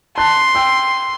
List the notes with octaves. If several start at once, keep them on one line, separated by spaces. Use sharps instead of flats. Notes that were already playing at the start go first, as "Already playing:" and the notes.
A5 C6 F#6
G5 E6